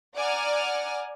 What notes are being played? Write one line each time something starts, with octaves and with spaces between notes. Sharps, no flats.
D5 F#5 G#5 A#5 F6